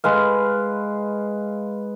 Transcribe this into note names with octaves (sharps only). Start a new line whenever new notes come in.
G#3 B4 F5